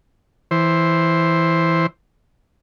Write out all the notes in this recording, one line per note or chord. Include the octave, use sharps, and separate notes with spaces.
E3 C5